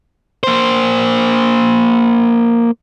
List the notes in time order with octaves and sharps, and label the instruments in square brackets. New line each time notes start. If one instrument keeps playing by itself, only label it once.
[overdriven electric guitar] A#3 C5